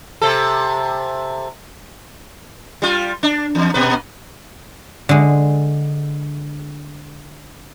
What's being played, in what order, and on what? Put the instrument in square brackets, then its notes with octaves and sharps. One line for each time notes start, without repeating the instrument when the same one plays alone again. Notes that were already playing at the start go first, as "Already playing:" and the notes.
[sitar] C3 A4
G3 F4
D4
E2
A#2 B4
[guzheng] D3 G#3